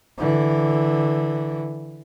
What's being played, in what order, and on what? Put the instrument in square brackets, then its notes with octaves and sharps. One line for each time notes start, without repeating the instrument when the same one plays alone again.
[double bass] D3 E3